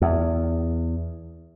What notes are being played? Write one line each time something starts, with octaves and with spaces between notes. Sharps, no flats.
E2